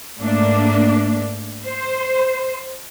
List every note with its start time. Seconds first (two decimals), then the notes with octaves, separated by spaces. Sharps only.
0.19 G#2 A3 A#3 D4
1.65 C5